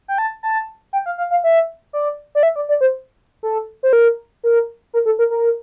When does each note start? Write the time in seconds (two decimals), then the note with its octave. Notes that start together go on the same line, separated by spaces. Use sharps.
0.08 G5
0.18 A5
0.43 A5
0.93 G5
1.06 F5
1.18 F5
1.31 F5
1.44 E5
1.93 D5
2.35 D5
2.43 E5
2.56 D5
2.69 D5
2.81 C5
3.43 A4
3.83 C5
3.93 A#4
4.44 A#4
4.94 A#4
5.06 A4
5.19 A#4
5.30 A#4